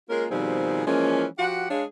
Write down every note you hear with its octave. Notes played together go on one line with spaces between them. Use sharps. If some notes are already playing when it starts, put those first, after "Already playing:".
G#3 A#3 C#4 F4 A#4
B2 D#3 F3 G3 C4 G#4
E3 F3 G#3 A#3 C#4
F3 F#4 G4 F#5
G#3 D4 G#4 C#5 D#5 F5